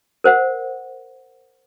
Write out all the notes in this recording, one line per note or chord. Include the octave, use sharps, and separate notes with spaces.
A#4 C5 F#5